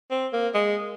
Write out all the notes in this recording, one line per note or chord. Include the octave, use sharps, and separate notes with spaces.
C4
A#3
G#3